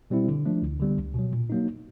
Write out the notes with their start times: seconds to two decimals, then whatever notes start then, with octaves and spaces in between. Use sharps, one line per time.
0.10 B2 G3 C4 E4
0.28 D3
0.46 F3 A3 D4
0.62 D2
0.80 D3 G3 B3
0.97 C#2
1.14 B2 F#3
1.32 A#2
1.50 F#3 A#3 D#4